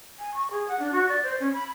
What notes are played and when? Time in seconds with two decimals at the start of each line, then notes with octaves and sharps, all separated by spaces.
0.18 G#5
0.33 C#6
0.50 G#4
0.68 F#5
0.79 D4
0.92 F#4
1.09 D5
1.23 C5
1.39 C#4
1.53 B5